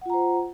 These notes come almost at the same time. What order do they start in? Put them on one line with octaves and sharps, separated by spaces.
F#5 F4 A#5 C5